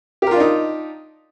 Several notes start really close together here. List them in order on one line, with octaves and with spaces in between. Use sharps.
G4 A#4 F4 D4 D#4